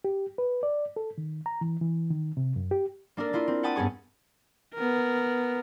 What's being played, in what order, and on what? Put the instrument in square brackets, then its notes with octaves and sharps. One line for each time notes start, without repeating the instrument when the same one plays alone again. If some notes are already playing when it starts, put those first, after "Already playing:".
[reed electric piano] G4
B4
D5
A4
D#3
A#5
E3
E3
D#3
C3
F#2
G4
[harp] A#3 D4 A4 A#4
A#3 E4 F4
C4
F#5 G5 A5 B5 D#6
G2 B3 C#4 G#4 C#6
[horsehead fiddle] B3 A#4